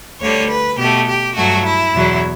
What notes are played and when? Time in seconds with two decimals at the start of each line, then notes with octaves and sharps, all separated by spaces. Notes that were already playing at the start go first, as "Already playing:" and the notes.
0.20 D2 D3 G3 C#5
0.50 B4
0.78 B2 A3 G4
1.08 G4
1.36 G2 F#3 A3 F#4
1.66 E4
1.95 E2 B2 F#3